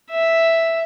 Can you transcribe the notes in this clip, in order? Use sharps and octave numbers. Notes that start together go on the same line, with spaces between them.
E5